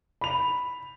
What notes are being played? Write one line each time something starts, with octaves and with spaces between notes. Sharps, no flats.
B5 F7